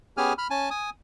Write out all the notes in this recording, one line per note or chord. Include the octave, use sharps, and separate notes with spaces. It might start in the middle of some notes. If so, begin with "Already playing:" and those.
B3 C#4 G4 G#4 G#5 F6
B5 F6
C#4 G#5 A5
G#5 D#6